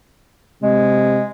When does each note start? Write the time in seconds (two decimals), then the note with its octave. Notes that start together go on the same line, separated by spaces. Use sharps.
0.63 C3 G#3